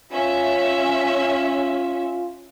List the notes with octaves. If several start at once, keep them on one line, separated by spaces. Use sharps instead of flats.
C#4 F4 E5